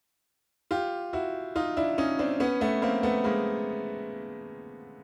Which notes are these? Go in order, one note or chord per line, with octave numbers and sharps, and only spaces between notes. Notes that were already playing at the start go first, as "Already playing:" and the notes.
F4 G4
E4 F#4
D#4 F4
D4 E4
C#4 D#4
C4 D4
B3 C#4
A3 B3
A#3 C4
A3 B3
G#3 A#3